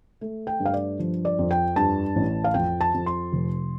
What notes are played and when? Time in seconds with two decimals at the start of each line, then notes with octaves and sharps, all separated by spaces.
0.21 A3
0.47 G5
0.60 G2
0.65 F5
0.74 D5
0.99 F3
1.25 D5
1.39 F2
1.51 G5
1.76 G2 A5
2.16 A1
2.44 F5
2.54 F2 G5
2.81 A5
2.94 F2
3.06 C6
3.33 F1